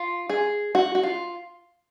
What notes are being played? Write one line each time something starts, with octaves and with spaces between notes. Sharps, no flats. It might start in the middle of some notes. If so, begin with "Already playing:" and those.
Already playing: F4
G#4
F#4
F#4
F4